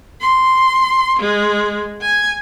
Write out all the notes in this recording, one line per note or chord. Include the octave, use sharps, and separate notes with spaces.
C6
G#3
G#5